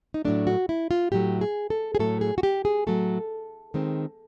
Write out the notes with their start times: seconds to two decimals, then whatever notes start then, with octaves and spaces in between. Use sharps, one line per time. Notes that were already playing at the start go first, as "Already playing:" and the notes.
0.14 D#4
0.25 A2 F#3 A3 D4
0.47 F#4
0.69 E4
0.91 F4
1.12 A2 F#3 A3 G4
1.41 G#4
1.70 A4
1.95 G#4
1.99 A2 F#3 A3 A4
2.21 G#4
2.38 F#4
2.43 G4
2.65 G#4
2.87 A2 F#3 A3 A4
3.74 D#3 G#3 C4